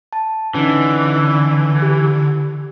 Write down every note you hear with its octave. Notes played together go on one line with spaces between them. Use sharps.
A5
D3 E3 C#4 D#4
G4